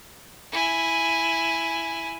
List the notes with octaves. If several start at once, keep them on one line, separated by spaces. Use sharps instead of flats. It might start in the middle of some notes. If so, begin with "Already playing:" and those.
E4 G#5